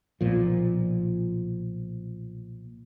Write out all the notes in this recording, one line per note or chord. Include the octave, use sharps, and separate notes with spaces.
B1 A#2 F3